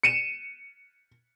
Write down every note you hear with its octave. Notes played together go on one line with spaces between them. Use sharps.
C#7 D#7 E7